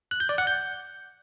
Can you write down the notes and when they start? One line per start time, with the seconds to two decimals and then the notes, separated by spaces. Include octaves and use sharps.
0.11 F#6
0.20 G6
0.29 D5
0.38 F#5
0.47 G6